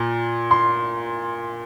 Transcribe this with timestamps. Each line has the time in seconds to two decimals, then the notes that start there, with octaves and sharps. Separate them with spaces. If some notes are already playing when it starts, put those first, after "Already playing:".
Already playing: A#2
0.51 C6